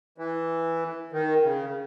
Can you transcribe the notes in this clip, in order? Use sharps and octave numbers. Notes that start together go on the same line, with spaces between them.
E3
D#3
C#3